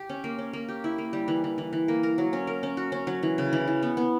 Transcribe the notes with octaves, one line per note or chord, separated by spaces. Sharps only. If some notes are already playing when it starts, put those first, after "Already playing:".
Already playing: G4
C#4
A#3
C#4
A#3
G4
E4
A#3
G3
E3
E3
E3
E3
A#3
A#4
F#3
C#4
A#4
C#4
F#4
C#4
F#3
E3
C#3
E3
E3
B3
B3